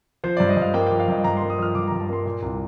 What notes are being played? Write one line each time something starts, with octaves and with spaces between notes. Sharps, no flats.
F3 C5
G2 D5
D#5
G2 F5
A#3 G5
F3 G5
F5
G2 D#5
G2 A#5
A#3 C6
D#6
F3 F6
G2 D6
G2 A#5
A5
A#3 C6
A#2
C2